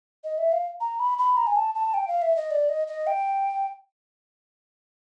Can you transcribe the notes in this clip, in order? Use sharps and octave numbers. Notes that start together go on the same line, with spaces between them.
D#5
E5
F5
A#5
B5
B5
A#5
G#5
A5
A5
G5
F5
E5
D#5
D5
D#5
D#5
G5